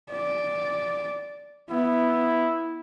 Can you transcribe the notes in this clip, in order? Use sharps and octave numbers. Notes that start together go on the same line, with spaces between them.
D5
B3 E4